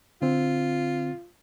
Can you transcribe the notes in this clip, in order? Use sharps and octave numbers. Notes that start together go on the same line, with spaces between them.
D3 C4 F4